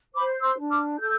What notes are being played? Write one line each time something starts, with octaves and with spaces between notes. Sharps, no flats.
C5 B5 D6
C6 E6
D4
D6 F6
A4 E6 G6